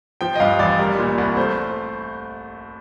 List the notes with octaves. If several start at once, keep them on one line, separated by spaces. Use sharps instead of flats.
F3 G5
D#5
G2 F5
A1 D5
G3 A#4
A#2
C2
A3 C5